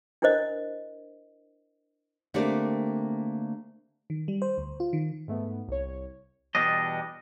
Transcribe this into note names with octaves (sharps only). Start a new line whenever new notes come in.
D4 E4 A#4 C5 D#5
D3 A3 A#3 C4 G4 D5
D#3
G3
C5
D2
F4
D#3
G#2 A3 B3
C2 C#5
E2 B2 G3 D4 D#5